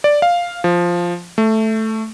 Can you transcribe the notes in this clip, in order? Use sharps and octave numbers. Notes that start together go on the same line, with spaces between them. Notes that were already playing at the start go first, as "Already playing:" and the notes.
D5
F5
F3
A3